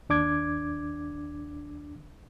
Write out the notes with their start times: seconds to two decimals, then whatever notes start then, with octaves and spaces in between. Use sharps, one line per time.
0.09 D#2 D4 D6 G#6